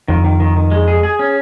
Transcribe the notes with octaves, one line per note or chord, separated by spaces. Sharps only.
F2 D#3
D#3
D#3
D#3
G#3
G#4
G#4
C#4